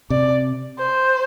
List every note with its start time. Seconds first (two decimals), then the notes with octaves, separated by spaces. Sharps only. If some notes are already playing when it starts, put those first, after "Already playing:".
0.10 C3 D5
0.79 C5